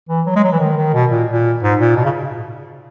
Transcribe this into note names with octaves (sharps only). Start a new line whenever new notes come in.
E3
F#3
G#3
F#3
E3
D#3
D#3
B2
A#2
A#2
G#2
A#2
B2
C#3